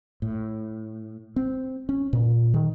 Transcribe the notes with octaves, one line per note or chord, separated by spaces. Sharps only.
A2
C4
C#4
A#2
D#3